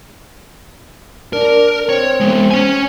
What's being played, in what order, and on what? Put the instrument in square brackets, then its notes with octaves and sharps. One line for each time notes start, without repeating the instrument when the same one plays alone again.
[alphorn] D4 [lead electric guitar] A#4
[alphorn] C4 [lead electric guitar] C#5
[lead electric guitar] G#3 B3
C#4 G#5